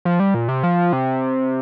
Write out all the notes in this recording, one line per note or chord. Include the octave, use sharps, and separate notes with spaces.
F3
G3
A#2
C3
F3
C3